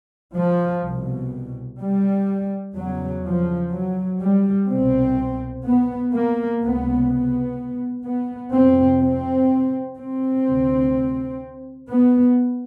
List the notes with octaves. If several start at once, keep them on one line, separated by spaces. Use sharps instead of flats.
F3
C2 B2
G3
E2 C#3 F#3
F3
F#3
G3
C2 B2 C4
B3
A#3
C#2 C3 B3
B3
B3
F2 C3 C4
C4
C4
D2 C3
B3